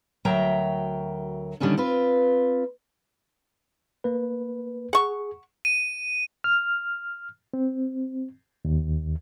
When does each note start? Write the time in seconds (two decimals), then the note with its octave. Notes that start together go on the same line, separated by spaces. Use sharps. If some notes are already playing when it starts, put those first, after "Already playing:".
0.25 D2 F#3 A#4 E5 G5 A#5
1.60 D3 D#3 G3 C#4 D4
1.77 C4 F4 B4
4.04 A#3 B4
4.93 G#4 F#5 C#6
5.65 D#7
6.44 F6
7.54 C4
8.65 D#2